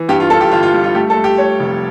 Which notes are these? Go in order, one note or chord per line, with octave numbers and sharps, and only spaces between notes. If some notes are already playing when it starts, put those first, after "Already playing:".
Already playing: E3
G2 G4
F4
G2 A4
G4
G1 F4
F4
G3
F4
A3 G4
A4
A3
G4
A3 C#5
F1